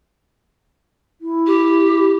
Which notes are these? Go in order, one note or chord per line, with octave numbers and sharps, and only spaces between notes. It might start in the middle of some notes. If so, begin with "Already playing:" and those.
E4
G4